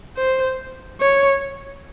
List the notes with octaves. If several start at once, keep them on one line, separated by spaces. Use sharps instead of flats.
C5
C#5